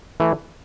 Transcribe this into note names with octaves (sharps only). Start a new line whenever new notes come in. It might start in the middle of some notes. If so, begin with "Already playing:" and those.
E3 A3